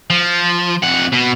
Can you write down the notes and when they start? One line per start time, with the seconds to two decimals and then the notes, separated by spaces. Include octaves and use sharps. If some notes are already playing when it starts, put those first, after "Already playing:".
0.10 F3
0.83 F2 F#5
1.12 B2